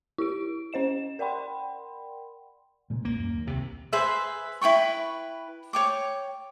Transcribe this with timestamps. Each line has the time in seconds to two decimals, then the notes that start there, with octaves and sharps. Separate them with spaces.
0.18 E4 G4 D7
0.73 C#4 C5 D#5 E7
1.19 A#4 D5 F#5 G5 B5 C6
2.90 A#2 C#3 G#3
3.05 B1 E2 A#3
3.19 F#2
3.33 D#2
3.47 C2 C3
3.93 G#4 B4 C5 E5
4.61 E4 B4 G5 C#6
5.73 C#5 G5 D6